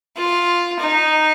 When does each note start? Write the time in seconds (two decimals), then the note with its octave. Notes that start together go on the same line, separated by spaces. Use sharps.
0.17 F4
0.79 D#4